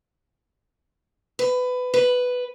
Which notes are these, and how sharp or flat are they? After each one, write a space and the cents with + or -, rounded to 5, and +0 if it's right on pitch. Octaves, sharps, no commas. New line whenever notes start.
B4 +20
B4 +5